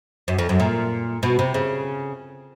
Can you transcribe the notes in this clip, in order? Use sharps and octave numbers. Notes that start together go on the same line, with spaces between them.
F#2
F2
F#2
A#2
B2
C3
C#3